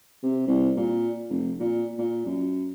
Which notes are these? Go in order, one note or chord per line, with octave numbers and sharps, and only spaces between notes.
C3
C2
A#2
F1
A#2
A#2
F#2